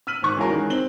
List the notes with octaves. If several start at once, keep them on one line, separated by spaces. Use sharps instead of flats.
E6 F6 B6 D#7 F#7
G#1 D#3 C#6 F#6
E3 F#3 G#3 C#4 F#4 A#4
D#3 G#3
C4 D#4 F#7 G7